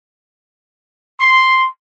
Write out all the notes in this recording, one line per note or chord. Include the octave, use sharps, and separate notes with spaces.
C6